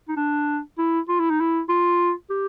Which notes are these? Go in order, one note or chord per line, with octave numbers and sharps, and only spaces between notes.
D#4
D4
E4
F4
E4
D#4
E4
F4
G4